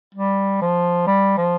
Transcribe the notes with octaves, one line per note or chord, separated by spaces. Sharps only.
G3
F3
G3
F3